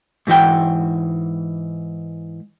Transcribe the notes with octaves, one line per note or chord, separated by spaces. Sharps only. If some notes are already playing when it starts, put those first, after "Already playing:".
G#2 E3 F#4 G5